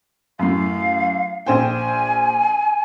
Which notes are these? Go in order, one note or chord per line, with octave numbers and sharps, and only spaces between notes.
F#2 A2 F5
A#1 C5 G5 G#5